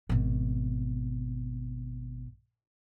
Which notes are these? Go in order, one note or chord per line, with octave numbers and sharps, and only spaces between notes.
G#1 B2